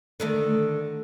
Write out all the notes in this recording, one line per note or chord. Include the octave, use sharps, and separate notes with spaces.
D3 D#3 A3